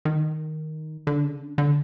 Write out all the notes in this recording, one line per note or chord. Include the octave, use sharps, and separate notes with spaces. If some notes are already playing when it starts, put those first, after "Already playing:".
D#3
D3
C#3
D3
D3